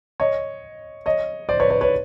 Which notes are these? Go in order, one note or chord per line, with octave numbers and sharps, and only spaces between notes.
C#5 D#5
C#5 D#5
C5 D5
B4 C#5
B4 C#5
B4 C#5